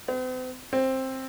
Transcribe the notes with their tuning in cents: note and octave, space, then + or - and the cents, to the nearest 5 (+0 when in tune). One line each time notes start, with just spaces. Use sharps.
C4 -45
C4 +10